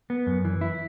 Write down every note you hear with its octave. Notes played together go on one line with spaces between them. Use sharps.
B3
F#2
E3
E4